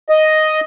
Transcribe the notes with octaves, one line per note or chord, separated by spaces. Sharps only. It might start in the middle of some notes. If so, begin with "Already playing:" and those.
D#5